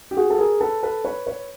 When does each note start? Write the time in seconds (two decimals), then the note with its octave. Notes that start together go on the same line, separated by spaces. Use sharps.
0.11 G4
0.17 F#4 G#4
0.30 A4
0.38 G#4 A#4
0.61 A4 B4
0.83 A4 B4
1.04 B4 C#5
1.26 B4 C#5